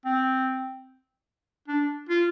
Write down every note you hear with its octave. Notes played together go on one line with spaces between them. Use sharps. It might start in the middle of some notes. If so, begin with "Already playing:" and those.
C4
D4
F4